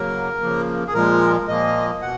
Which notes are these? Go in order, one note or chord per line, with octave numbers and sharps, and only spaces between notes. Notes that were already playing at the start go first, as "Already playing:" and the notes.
Already playing: C#3 F#3 A#3 A#4
C#3 F3 A#3
G#4
A#2 F3 G#3 A#4
A#2 F3 A#3 D#5
B2 F#5